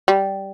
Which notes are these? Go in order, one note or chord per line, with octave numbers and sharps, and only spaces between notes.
G3